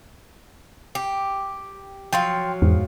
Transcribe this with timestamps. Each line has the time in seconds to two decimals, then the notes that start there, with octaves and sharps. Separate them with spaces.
0.95 G4
2.13 F3 F#3 F5 G5 C6
2.62 E2 G#2